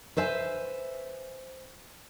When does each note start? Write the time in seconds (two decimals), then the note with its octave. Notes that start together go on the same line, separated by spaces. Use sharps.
0.17 B4 C5 E5 G#5